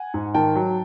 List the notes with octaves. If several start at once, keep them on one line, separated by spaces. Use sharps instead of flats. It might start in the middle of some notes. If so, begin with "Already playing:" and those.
Already playing: F#5 G#5
G#2
D#3 G5 A5
F#3